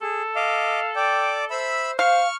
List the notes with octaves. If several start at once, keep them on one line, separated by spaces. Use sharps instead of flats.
G#4 A4
D#5 F5 D6
D5 G5 D6
C5 E5 B5 E6
C5 F5 C#6 F6